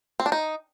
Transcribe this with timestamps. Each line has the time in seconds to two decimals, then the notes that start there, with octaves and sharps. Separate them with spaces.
0.20 C4
0.26 D4
0.32 D#4